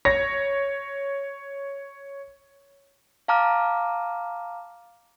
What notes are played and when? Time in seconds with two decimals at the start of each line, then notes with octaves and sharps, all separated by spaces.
0.05 C#5 A#6
3.28 F5 A5 A#5 D6 F6